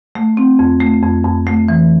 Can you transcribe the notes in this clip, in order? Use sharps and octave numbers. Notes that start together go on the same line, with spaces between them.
A3
C4
F2
A3
F2
F2
A3
E3